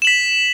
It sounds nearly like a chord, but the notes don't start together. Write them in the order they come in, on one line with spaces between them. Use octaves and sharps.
E7 F#7 B6